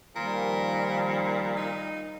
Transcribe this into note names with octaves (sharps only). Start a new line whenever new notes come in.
A#2 D#3 F3 G3 A#4
D#4